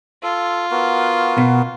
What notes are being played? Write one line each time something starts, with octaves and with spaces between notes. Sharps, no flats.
F4 A4
B3 F#4 A#4
B2